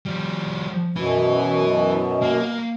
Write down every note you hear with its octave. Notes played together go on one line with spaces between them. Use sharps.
F3 G3
F#2 B2 E4 B4
A#3